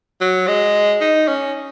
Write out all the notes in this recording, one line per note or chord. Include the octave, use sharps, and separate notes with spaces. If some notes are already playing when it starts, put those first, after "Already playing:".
F#3
G#3
D#4
C#4